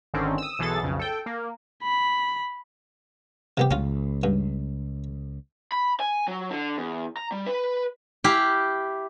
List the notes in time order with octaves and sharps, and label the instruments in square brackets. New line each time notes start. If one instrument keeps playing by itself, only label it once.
[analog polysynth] G#1 D3 D#3 C4 C#4
D#6 E6
B1 E3 G#4 A4 A6
B1 F2 C#3
A4 G5
A#3
[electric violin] B5
[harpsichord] C3 B3 G4
[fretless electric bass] C#2 [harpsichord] C#4 F4
[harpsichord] G2
[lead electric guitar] B5
G#5
F#3
D3
E2
A#5
G3
B4
[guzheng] E4 G4 F5